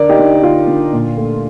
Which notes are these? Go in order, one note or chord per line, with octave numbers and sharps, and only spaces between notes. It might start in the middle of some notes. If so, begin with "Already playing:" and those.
Already playing: D3 A#4 D5
D#4 G4
D3
D3 F4
D3
A#2
A3